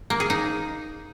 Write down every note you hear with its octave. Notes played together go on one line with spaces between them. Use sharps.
A#3
G#4
D#4